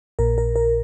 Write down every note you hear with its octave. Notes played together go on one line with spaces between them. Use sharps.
A#1 A#2 A#4
A#4
A#4